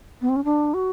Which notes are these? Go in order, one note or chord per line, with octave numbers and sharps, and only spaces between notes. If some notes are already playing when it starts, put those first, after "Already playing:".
B3
C4
C#4
D4
F#4